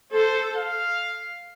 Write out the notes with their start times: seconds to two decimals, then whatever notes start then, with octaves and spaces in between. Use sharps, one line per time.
0.13 A4 C5
0.56 F5